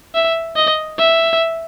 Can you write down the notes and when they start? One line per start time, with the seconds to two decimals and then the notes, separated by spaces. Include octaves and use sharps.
0.15 E5
0.56 D#5
0.98 E5